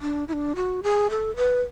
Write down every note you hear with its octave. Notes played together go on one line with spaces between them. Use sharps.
D4
E4
D4
F#4
G#4
A4
B4